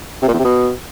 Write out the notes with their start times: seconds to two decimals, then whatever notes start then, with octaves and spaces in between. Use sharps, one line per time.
0.22 C3
0.28 A#2
0.33 E2
0.39 C3
0.45 B2